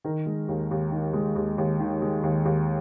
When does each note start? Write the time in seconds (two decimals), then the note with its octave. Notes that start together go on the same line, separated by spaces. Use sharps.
0.04 D#3 A#4
0.26 G#3
0.48 D#2
0.71 D#2
0.92 D#3
1.14 G#3
1.35 D#2
1.58 D#2
1.80 D#3
2.02 G#3
2.23 D#2
2.45 D#2